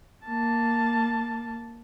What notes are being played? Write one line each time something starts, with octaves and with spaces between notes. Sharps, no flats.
A#3 A5